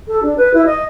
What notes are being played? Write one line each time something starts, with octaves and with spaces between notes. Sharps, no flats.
A4
D4
B4
E4
D#5